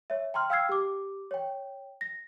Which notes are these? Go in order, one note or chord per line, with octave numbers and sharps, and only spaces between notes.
C#5 E5
G5 A#5 C6 F6
F5 G5 E6 F6 G#6 C7
G4 D6
C#5 G5
A#6